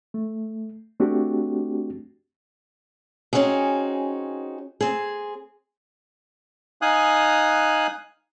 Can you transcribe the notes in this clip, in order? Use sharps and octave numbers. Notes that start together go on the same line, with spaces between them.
A3
A3 C4 D4 F#4 G4
C4 C#4 D#4 F#4 G#4
C4 G#4
D#4 F5 G#5 D#6 F#6